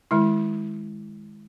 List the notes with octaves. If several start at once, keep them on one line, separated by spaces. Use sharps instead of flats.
D#3 G#3 E4